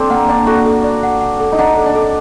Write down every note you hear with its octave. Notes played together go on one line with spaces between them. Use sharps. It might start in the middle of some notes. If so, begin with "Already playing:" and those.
Already playing: C4 D4 A4
A#3 F#5
D4 D5
F#4 A4
A4
D5
F#5
F#5
A4
D#4
D4 F#5
A4
D4
A4